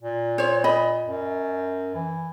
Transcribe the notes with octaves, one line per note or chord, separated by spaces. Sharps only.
A#2
C5 C#5
D#5 B5
F#2
E3